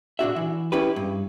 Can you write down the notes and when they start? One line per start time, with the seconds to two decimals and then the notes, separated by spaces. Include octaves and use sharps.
0.19 A#2 D4 F#4 E5
0.36 E3
0.72 C#4 E4 G4 B4
0.96 G2